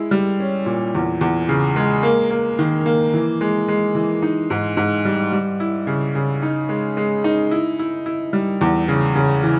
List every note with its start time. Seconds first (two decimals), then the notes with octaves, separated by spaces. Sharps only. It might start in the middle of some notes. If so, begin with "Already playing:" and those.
Already playing: G#3 E4
0.11 G3
0.40 C#4
0.66 A#2
0.95 E2
1.21 E2
1.49 C#3
1.76 G#3
2.03 A#3
2.31 A#3
2.59 D#3
2.86 A#3
3.14 E3
3.41 G#3
3.68 G#3
3.95 E3
4.22 D#4
4.50 G#2
4.77 G#2
5.05 G3
5.32 G3
5.60 E4
5.87 C#3
6.15 C#3
6.42 D#4
6.69 G#3
6.97 G#3
7.24 D#4
7.51 E4
7.79 E4
8.06 E4
8.33 G3
8.61 E2
8.88 C#3
9.15 C#3
9.43 E3